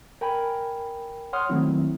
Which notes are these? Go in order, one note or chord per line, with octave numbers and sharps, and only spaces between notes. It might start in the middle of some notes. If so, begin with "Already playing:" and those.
A#4 G5 G#5 B5
C#5 F#5 C6 D#6 F6
D#3 F#3 A3 C4 E4